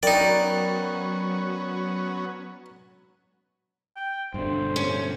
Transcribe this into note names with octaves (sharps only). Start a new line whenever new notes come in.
F#3 B3 C#4 D#4 F#4 A#4 D5 G5
G5
G2 B2 D3 C5
C#4